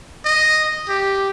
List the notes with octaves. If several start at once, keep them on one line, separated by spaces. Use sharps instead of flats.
D#5
G4